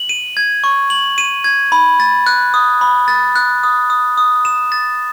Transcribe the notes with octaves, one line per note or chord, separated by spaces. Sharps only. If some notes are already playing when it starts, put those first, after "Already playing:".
Already playing: F#7
D#7
G#6
C#6
F#7
D#7
G#6
B5
A6
F#6
D#6
B5
A6
F#6
D#6
D#6
D#6
E7
A6